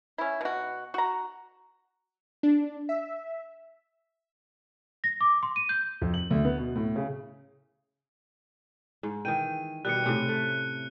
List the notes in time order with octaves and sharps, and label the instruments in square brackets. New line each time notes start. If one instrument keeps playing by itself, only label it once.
[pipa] C#4 E4
B2 F#4
F#4 A#5
[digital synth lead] D4
E5
[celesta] A#6
D6
C6
D#7
G6
[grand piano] F2
F#7
D2
B3
B2
A2
C#3
[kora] G#2
[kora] D#3 E3 G5 [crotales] D#7
[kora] B2 D#3 G3 [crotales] F#6 C#7
[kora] A2 C3 C#4
A3